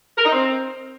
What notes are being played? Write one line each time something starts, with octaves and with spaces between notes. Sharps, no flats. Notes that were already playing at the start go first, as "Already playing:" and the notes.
A#4
D#4
C4